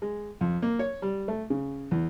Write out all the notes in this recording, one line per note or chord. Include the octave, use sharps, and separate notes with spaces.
G#3
F2
A#3
C#5
G3
A3
C#3
E2